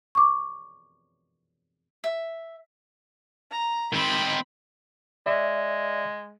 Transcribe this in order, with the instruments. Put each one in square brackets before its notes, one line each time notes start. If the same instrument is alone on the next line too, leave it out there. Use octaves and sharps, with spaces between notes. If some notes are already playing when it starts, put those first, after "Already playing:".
[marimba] C#6 D6
[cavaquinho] E5
[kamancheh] A#5
[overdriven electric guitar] D#3 C4 [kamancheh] B5
[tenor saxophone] G#3 [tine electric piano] D5 E5